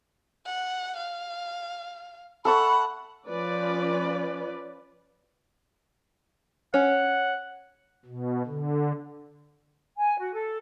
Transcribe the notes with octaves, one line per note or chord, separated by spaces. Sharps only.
F#5
F5
A4 E5 F#5 B5 C#6
F3 C#4 B4 D5
C#4 F#5
B2
D3
G#5
F#4
A4